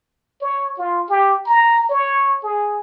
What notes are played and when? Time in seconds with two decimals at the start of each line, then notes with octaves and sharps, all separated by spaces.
0.42 C#5
0.78 F4
1.09 G4
1.46 A#5
1.89 C#5
2.43 G#4